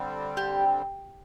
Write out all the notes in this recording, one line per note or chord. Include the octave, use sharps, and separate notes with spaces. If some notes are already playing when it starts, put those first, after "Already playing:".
Already playing: D3 G3 C4
G4